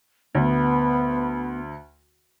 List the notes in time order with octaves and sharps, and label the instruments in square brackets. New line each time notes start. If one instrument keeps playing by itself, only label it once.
[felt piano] D2 [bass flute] B3